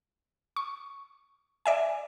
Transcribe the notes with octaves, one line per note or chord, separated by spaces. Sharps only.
C#6
D5 E5 G#5